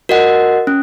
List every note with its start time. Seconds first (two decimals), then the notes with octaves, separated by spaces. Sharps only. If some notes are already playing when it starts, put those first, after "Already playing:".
0.09 F#4 A#4 D#5 F#5
0.67 C#4